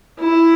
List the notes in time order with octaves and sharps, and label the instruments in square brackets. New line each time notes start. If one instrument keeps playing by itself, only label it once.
[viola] E4